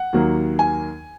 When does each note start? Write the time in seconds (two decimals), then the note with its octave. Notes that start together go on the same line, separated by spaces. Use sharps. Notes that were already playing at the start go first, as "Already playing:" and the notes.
Already playing: F#5
0.13 D#2 D#3 F#3 A#3
0.59 G#5